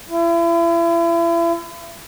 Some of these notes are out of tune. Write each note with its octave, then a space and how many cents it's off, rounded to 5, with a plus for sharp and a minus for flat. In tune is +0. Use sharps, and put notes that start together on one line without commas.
E4 +40